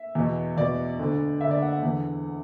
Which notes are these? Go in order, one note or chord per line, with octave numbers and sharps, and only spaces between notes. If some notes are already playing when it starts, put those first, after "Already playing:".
Already playing: E5
E2 B2
E2 B2 D5
D2 D3
D2 D3 E5
D5
F#5
F#5
E2 D3